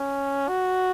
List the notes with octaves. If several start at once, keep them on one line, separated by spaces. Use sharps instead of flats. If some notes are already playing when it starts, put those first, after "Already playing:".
Already playing: C#4
F#4